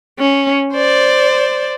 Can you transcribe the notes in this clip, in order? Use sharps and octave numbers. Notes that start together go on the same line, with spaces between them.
C#4
C5 D5